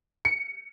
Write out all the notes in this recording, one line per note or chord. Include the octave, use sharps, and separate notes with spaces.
C#7